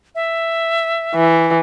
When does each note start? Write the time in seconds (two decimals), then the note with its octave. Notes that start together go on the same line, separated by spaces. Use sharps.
0.15 E5
1.15 E3